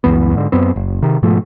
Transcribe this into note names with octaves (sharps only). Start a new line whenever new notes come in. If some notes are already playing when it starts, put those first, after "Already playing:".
C#2 F#2 E3 B3
G#2 D3
F#2 B3 C4
F#1
C3 D#3
G#2 B2 F3 A3